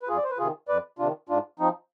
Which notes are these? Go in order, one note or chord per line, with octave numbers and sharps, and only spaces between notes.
B4
F2 F4 G#4
D5
C5
B4
C3 D#3 F4 G#4
F2 B4 D5
C3 D#3 D4 F4
G#2 D4 F4
F3 C4 D#4